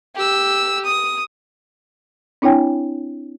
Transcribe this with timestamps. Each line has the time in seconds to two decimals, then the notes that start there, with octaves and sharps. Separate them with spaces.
0.15 G4 E6
0.85 D#6
2.42 C4 D4 E4 C#5 G5 G#5